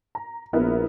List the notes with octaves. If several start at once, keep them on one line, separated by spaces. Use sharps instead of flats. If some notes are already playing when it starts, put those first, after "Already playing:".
A#5
A#1 B3 E4 A#4